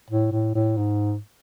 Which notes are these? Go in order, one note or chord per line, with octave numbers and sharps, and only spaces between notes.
A2
A2
A2
G#2